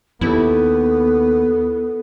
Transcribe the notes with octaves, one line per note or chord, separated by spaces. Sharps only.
D#2 B3 E4 A4